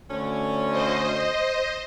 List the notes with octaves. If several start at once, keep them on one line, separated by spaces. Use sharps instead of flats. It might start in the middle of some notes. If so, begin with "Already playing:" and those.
D2 D3 C#4
C5 D#5